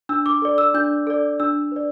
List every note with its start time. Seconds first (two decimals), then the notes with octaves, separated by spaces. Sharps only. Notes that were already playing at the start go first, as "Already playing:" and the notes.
0.09 D4 E6
0.26 D6
0.42 A4 D5
0.58 E6
0.74 D4 G6
1.07 A4 D5
1.40 D4 E6
1.72 B4 D5